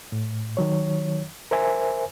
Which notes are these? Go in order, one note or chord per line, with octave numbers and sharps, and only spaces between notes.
A2
D#3 F#3 C#5
A#4 C5 E5 G#5